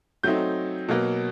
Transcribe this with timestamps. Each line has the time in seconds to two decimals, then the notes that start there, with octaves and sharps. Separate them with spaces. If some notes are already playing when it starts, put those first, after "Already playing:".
0.23 F#3 A3 C4 D#4 G6
0.88 B2 F#3 A#3